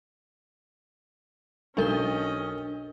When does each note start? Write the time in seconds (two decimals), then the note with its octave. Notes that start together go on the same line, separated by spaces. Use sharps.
1.77 B1 C#4 D4 A4 A#4 D#5 G6 G7